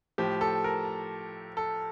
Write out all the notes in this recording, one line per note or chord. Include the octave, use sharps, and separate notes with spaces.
A2 F3 G4
A4
A#4
A4